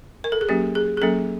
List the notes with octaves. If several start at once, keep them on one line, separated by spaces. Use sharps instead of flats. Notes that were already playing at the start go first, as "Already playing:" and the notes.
A#4
A4
G#4
F#3 A#3 C#4 G4
G#4
G#4
F#3 A#3 C#4 A4